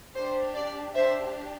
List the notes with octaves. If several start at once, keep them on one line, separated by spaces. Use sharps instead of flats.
D4 G4 C5
D5
D4 G4 C5 E5